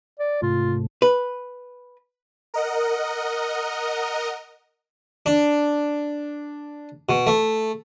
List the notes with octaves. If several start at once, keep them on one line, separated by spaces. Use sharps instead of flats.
D5
G#2 C3 A3 F4
B4
A#4 D#5 F#5
D4
B2
A3